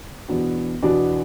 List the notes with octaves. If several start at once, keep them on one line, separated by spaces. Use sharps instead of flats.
E2 B2 B3 D4 F#4
E2 B2 B3 D4 F#4